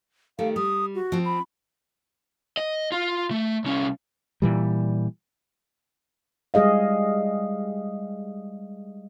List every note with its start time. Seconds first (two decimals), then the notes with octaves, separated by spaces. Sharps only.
0.39 D#3 G3 A3 F5
0.56 G3 D#6
0.95 F#4
1.12 F3 C4
1.25 B5
2.57 D#5
2.92 F4
3.31 A3
3.64 C2 C#4
4.42 A#2 E3 G3
6.54 G3 G#3 G#4 D#5 F5